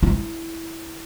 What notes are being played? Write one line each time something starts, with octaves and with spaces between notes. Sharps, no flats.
E4